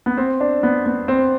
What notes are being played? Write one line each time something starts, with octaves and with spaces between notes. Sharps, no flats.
B3
C4
D4
B3
B3
C4